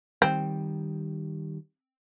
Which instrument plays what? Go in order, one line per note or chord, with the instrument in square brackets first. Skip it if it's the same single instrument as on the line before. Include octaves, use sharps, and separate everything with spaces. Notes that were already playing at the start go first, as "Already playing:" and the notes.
[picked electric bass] D#3 G3 [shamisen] C4